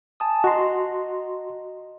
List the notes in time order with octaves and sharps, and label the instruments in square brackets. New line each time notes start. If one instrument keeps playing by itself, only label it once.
[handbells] G#5 A5 D#6
[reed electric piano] F#4 C6 [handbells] D#5 A#5